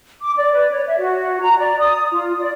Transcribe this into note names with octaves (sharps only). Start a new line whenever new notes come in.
D6
D5
B4
C#5
E5
F#4
A#5
D5
D#6
F4
D5